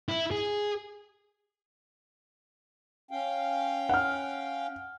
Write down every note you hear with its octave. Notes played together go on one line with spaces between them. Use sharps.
E4
G#4
C#4 F5 G5
F#5 F6